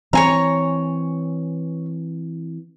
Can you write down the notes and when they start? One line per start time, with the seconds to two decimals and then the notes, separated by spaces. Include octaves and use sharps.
0.13 E3 C4 C#5 G#5 A#5